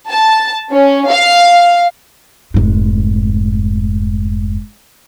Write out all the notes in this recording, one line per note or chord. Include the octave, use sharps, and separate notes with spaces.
A5
C#4
F5
F1 G#2